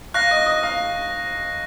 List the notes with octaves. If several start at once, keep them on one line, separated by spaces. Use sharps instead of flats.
F5 C#6 F#6 A#6
D#5
D#5
F5